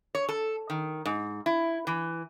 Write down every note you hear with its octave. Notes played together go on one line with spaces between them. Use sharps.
C#5
A4
D#3
G#2
E4
E3